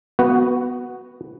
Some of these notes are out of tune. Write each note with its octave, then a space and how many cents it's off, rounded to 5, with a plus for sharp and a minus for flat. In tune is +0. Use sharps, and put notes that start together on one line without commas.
B3 +0 F#4 +0